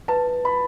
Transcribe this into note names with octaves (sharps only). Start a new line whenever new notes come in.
B4 A5
B5